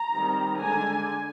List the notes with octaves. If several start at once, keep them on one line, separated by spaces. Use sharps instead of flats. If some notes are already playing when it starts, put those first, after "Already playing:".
Already playing: A#5
D#3 G3 C4
D3 G#3 D4 G#5